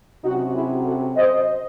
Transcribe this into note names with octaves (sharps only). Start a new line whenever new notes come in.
C3 F#3 C#4 D#4 F#4
E4 G#4
F#4 A4
C5 D#5